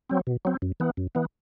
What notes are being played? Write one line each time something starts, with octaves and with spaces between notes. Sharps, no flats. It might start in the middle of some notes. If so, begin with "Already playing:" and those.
F#3 C4
B2
F#3 C4
F#2
E3 B3
F#2
E3 B3